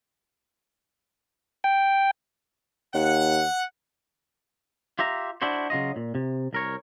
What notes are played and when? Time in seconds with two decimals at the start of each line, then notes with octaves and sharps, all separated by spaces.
1.64 G5
2.94 D#2 F#5
4.99 F4 G4 E5 A#5
5.42 D4 E4 F#4 C5
5.70 C#3 F#3 F4 D#5
5.96 A#2
6.15 C3
6.53 C2 A#4 C#5